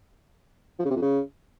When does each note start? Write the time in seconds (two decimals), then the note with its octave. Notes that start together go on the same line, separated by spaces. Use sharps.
0.79 F3
0.85 C#3
0.90 C3
0.96 F2
1.02 C#3